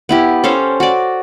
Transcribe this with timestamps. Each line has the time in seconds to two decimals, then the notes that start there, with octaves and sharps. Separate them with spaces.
0.09 B3 E4 G4
0.44 C#4 A4 C5 F5
0.80 F#4 D5